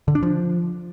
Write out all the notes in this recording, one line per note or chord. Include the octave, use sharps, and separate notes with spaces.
D3
D4
F3